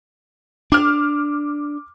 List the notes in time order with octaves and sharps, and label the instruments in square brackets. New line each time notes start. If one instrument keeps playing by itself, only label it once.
[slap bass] D4 [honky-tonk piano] D6 F6